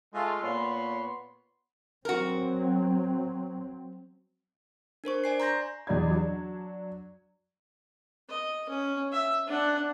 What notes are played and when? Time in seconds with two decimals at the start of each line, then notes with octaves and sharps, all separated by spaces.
0.14 G#3 A3 F4
0.43 A#2 B3 C#5 B5 C6
2.05 F#3 C4 F#4 A#4
5.04 D4 A#4 C5 C#6
5.24 D5 G#5 C7
5.40 A#5 C6 G6 A#6
5.87 E2 F#3 D5 D#5 B5 G#6
6.10 F#3 D4
8.29 D#5
8.70 C#4
9.12 E5
9.47 D4 F#5